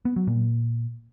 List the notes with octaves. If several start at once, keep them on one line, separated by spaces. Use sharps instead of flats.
B3
F#3
A#2